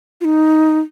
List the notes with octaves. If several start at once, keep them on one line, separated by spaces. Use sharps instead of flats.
F4
D#4